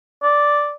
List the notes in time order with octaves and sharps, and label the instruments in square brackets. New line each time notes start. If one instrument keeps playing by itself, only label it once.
[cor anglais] D5